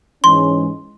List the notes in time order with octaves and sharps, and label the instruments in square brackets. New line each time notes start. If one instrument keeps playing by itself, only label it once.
[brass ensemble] G#2 E3 G#3 C#4 [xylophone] C6